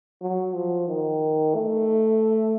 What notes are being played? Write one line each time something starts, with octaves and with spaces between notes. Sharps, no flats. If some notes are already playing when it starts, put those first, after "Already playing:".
F#3
F3
D#3
A3